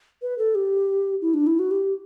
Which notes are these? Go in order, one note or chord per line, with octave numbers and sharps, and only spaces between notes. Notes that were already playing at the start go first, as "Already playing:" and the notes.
B4
A4
G4
E4
D4
E4
F#4
G4